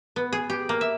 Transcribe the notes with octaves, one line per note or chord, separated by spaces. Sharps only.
B3
G#4
G4
A#3
E5